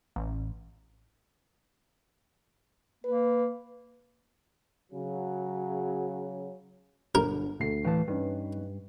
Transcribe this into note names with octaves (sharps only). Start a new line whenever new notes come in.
A1
A#3 B4
C#3 F#3
G1 D3 A#4
D2 A3 C7
A2 E3 B4 F5 A5
G2 C#4 D#4 B4